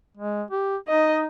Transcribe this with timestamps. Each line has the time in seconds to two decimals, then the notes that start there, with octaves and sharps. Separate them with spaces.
0.17 G#3
0.51 G4
0.88 D#4 D#5